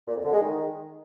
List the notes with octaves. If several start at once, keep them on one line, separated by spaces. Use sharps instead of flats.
A#2
F2
D3
G#3
D#3